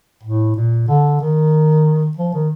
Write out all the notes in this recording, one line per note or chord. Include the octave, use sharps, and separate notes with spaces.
A2
A#2
D3
D#3
F3
D#3